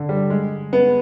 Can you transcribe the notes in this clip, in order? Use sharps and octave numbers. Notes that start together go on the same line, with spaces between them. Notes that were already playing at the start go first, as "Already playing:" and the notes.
Already playing: D3
G3
G#3
B3